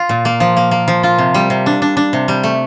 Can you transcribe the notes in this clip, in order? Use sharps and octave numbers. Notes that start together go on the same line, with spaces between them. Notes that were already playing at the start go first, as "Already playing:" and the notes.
Already playing: F4
A#2
A#3
F3
A#3
A#3
F3
F4
C3
G3
C3
D4
D4
D4
C3
G3
A3